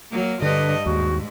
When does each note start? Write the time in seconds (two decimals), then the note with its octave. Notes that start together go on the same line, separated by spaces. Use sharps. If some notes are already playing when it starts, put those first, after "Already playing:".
0.11 F#3 A#3
0.42 G2 D3 B4 D#5
0.86 D#2 G#2 F#4